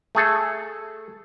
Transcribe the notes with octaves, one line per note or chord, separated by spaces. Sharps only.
A3 G#4 A4